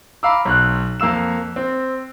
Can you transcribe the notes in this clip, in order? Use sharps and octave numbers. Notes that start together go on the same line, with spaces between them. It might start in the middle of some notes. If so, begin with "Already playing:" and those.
F5 A#5 B5 D6 E6
B1 F#6
F2 A#3 F5 E6 E7
C4